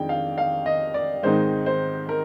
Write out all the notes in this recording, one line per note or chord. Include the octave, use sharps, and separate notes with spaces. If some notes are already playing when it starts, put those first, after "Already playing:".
Already playing: F2 D#3 G#3 D4 G5
F5
F5
D#5
D5
G#2 D#3 G#3 C4 D#4 C5
C5
A#4